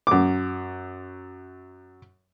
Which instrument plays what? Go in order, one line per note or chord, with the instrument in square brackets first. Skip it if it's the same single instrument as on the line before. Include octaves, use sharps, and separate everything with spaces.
[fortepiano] F#2 D6